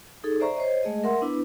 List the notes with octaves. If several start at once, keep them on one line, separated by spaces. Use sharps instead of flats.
D#4 G#4 A4
C5 D5 E5 A#5 C#6
C5 C#5 D#5
G#3 A3 G#4 D#5
A#4 E5 F#5 C6
B3 D4 E4 B4